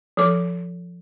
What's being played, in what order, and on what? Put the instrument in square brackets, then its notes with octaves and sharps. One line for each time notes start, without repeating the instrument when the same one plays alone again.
[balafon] F3 A4 D6